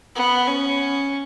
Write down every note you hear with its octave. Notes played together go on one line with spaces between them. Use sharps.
B3
C#4